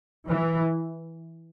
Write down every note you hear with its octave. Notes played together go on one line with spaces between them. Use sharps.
E3